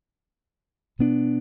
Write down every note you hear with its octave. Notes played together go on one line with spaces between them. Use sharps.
B2 B3 D4